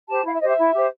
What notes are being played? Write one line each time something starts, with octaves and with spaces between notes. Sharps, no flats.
G4 C5 A5
E4 F5
E5
G4 C5 D#5
E5
E4
G4 C5